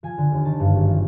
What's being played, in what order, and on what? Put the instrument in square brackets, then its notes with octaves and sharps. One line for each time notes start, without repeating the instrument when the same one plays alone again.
[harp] F3 G#5
D3
D#2
D#3 A5
G2
G#1
F3